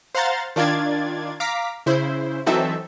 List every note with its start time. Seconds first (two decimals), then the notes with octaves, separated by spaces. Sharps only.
0.15 C5 F5 F#5 A#5 C6 A6
0.56 D#3 D4 F4 D5 G#6 A6
1.40 F5 A#5 D6 B6
1.86 C#3 E4 C5
2.46 E3 F#3 C4 D#4 A4 E5